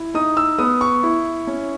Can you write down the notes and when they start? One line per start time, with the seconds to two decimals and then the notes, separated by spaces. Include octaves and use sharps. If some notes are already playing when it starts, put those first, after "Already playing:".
Already playing: E4
0.14 D#4 D#6
0.37 E6
0.59 B3 D#6
0.81 C#6
1.03 E4
1.47 C#4